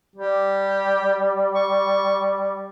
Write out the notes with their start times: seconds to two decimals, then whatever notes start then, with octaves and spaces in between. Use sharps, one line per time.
0.16 G3 G4
1.55 C#6